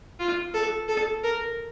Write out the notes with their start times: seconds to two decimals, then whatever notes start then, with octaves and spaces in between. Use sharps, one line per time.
0.19 F4
0.54 A4
0.88 A4
1.23 A#4